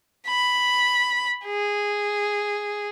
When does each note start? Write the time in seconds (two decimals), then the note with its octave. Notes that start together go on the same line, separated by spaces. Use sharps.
0.27 B5
1.46 G#4